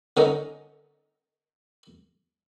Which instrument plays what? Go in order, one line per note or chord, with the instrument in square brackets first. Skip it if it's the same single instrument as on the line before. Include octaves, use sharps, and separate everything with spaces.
[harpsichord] D3 C#4 D#4 A#4